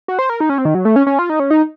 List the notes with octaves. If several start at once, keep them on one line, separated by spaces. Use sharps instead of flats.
F#4
C5
A#4
D#4
C#4
C4
D#3
F#3
A3
C#4
C#4
F4
D#4
C#4
D#4